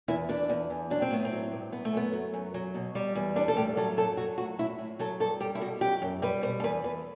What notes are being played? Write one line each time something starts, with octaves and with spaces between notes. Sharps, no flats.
E2 E4
E2 D4
E2
E2
F#3 D4
C4
A2 B3
C4
F#3
G2
F#2 B3
A3
F#2 B3
F#3
F#2
F#3
B2
G3
E2
G3 D4
A4
A2 G4
F#3 A4
F#2 A4
F#3 F#4
A2 F#4
A2 E4
A2
F#3 A4
G2 A4
G3 G4
E4
B2 F#4
F#2 G4
F#2
G3 B4
B2 C5
A4
E2 B4
E2 B4